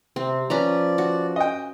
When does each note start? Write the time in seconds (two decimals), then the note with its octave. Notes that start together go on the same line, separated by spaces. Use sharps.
0.16 C3 C4
0.50 F3 C#4 B4 D5 A#5
0.98 F#4
1.36 D#5 G5